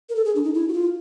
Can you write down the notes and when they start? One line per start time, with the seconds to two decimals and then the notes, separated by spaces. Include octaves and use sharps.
0.09 A#4
0.16 A4
0.25 G#4
0.36 D4
0.44 D#4
0.54 E4
0.69 F#4
0.73 F4